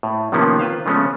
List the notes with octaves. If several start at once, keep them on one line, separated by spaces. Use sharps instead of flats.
A2
C3 D#3 F3 A#3 B3 C#4
F4 B4 C5 F5
C#3 F3 G#3 A3 B3 C#4